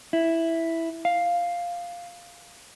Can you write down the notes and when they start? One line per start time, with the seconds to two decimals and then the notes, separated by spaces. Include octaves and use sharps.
0.13 E4
1.05 F5